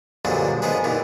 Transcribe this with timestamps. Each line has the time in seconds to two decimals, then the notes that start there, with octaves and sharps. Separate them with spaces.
0.25 G2 A#2 D3 F3 F#3 G#3
0.62 D#3 F3 G#3 B3 G#4
0.84 D#2 A#2 D#3 E3